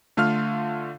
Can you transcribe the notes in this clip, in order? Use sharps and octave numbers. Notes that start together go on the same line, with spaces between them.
D3 A3 F4 F5 F6